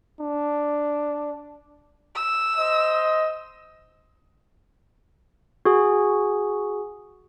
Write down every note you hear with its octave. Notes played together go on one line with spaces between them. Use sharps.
D4
E6
C5 D#5
F#4 G#4